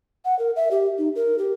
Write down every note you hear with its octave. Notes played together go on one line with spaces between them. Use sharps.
F#5
A#4
E5
G4
D#4
A#4
G4